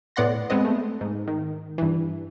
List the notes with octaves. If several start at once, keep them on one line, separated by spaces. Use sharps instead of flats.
A2 B3 D5 F#5 C6 A#6
G#3 B3 C4 D#5
A3
G#2
D#3
G2 E3